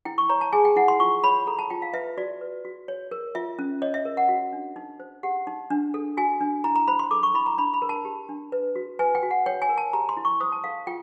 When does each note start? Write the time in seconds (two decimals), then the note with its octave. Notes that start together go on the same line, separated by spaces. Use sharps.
0.05 E4 G5
0.18 C#6
0.29 C#5 A#5
0.41 A5
0.53 G#4 G#5
0.65 G5
0.76 E4 F#5
0.88 C6
1.00 F4 C#6
1.24 C#5 B5
1.47 A4 A#5
1.59 A5
1.70 F4 G5
1.82 F5
1.94 B4 E5
2.17 F#4 D5
2.41 B4
2.65 F#4
2.88 C#5
3.11 A#4
3.35 F4 E5
3.59 C#4
3.82 C#5 D#5
3.94 E5
4.05 A#4
4.17 F#5
4.29 F#4
4.53 D4
4.76 D#4
5.00 C5
5.23 G4 F#5
5.47 D#4
5.70 D4
5.94 A4
6.17 F#4 G#5
6.41 D4
6.64 E4 A#5
6.76 A#5
6.87 C5 B5
6.99 C6
7.11 A4 D6
7.23 C#6
7.34 E4 B5
7.46 A#5
7.58 D4 B5
7.74 B5
7.82 A#4
7.89 A5
8.05 G4
8.29 D4
8.52 B4
8.75 F#4
8.99 B4 G#5
9.15 G5
9.23 F#4
9.31 F#5
9.46 C#5 G5
9.62 G#5
9.69 A#4
9.78 A5
9.93 G4 A#5
10.09 C6
10.17 E4
10.25 C#6
10.41 C5 D#6
10.52 A5
10.64 A4 F5
10.87 F4 G5